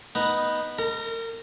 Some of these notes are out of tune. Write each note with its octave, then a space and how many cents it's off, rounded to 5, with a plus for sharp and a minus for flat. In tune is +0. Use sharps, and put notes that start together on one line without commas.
B3 -5 D#4 +0
A#4 -35 A#5 +0